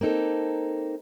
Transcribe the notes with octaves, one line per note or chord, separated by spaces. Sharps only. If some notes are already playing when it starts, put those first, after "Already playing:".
A#3 C4 D#4 A4